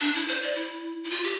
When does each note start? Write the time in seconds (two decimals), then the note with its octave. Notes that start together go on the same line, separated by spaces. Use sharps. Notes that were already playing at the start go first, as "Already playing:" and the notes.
0.01 D4
0.14 E4
0.28 C5
0.42 D5
0.55 E4
1.04 E4
1.10 F4
1.24 G4